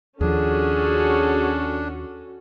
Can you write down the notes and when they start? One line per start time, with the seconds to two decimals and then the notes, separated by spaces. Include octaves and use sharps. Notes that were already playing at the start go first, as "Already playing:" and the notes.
0.21 D#2 F3 C#4 D4 F#4 G#4 A4